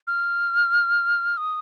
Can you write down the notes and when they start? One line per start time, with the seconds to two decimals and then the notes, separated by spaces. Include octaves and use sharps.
0.07 F6
1.37 D#6